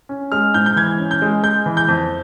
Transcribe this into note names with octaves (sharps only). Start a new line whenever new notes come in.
C#4
G#3 F6
G#2 G6
G6
E3 G#6
C#4
G6
G#3
G#3 G6
E3
G6
F2